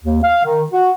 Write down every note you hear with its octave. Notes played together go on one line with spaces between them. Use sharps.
D#2
F5
D#3
F#4